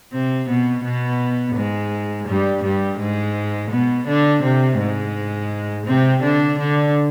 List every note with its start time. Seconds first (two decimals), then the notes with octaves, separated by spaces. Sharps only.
0.13 C3 C4
0.49 B2 B3
0.84 B2 B3
1.56 G#2 G#3
2.28 G2 G3
2.64 G2 G3
2.99 G#2 G#3
3.71 B2 B3
4.07 D3 D4
4.43 C3 C4
4.78 G#2 G#3
5.86 C3 C4
6.22 D3 D4
6.59 D3 D4